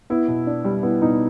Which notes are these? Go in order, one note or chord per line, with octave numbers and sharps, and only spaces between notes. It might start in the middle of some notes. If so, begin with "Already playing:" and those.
B3 E4
B2
D4
G3
B3 E4
B2 D#4